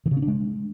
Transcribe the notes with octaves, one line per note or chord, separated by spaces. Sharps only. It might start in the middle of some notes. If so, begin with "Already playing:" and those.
D#3
C#3
C#4
D4
G#3